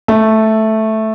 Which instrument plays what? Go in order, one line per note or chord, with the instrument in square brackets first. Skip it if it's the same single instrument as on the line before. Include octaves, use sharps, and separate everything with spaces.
[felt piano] A3